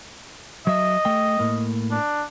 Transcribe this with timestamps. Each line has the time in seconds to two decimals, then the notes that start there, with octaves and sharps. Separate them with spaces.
0.67 F#3 D#5 E5
1.05 A3 G5
1.39 A2 A#3
1.91 D4